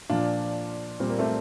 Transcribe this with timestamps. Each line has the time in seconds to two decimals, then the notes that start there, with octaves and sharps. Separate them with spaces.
0.10 A#2 F3 D4 F4
1.00 A#2 G3 C4
1.10 A#3
1.19 A3 C4